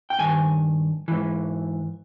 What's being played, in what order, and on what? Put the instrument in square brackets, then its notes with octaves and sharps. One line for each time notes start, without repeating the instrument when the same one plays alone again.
[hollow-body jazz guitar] G5
G2 D#3 G#5
G#2 E3